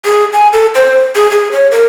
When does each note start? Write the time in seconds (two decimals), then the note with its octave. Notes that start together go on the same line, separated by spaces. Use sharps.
0.05 G#4
0.33 G#5
0.53 A4
0.75 C5
1.15 G#4
1.31 G#4
1.52 C#5
1.72 A#4